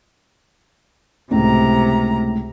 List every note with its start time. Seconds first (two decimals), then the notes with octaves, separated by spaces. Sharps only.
1.31 C#2 A2 C3 A#5